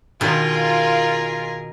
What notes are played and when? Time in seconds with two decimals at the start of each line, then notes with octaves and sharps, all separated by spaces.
0.21 B2 D#3 F4 G#4 A#4